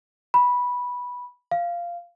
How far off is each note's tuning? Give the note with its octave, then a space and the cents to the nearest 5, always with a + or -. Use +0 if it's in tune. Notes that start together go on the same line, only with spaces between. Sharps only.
B5 -10
F5 -10